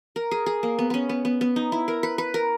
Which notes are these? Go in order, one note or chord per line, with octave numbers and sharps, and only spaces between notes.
A#4
G#4
G#4
A#3
B3
B3 C#4
B3
B3
B3
D#4
E4
A#4
B4
B4
A#4